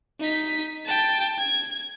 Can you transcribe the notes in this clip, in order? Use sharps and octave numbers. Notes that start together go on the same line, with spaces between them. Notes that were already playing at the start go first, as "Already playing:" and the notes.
D#4 B6
G5 A5
G#6